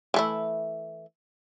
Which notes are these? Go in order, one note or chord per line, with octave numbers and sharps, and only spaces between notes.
E3 A3 E4